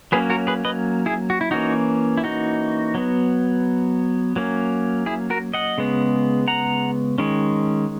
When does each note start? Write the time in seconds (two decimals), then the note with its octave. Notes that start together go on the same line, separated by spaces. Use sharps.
0.12 F#3 A#3 C#4 G#4 B4
0.30 F#4 A#4
0.47 G#4 B4
0.65 B4 D#5
1.06 E4 G#4
1.30 F#4
1.41 E4
1.51 E3 A#3 C#4 D#4 F#4
2.17 E4
2.24 D#4 F#4
2.95 F#3 B3
4.36 F#3 A#3 C#4
5.06 E4 G#4
5.30 F#4 A#4
5.54 D#5 F#5
5.78 C#3 G#3 B3
6.48 F#5 A#5
7.18 D#3 G#3 C#4